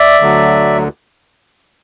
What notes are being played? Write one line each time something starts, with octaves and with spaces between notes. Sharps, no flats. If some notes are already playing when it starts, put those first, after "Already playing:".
Already playing: D5 E5
D2 D3 F#3